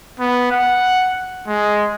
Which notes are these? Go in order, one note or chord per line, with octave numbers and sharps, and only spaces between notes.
B3
F#5
G#3